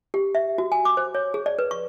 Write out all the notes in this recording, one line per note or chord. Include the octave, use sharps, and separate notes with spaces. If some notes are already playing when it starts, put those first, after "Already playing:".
G4
E5
F#4
G#5
D6
C5
C#5
G#4
D5
B4
C#6